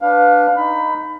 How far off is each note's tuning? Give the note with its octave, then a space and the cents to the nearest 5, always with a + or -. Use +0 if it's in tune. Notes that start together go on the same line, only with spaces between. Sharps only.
D4 +0 B4 +0 F5 +25
D#4 +0 B5 +20